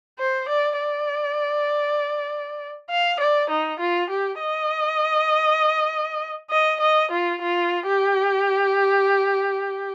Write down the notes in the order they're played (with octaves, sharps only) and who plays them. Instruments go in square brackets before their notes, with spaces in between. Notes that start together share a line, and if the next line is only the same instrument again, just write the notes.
[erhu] C5
D5
D5
F5
D5
D#4
F4
G4
D#5
D#5
D#5
F4
F4
G4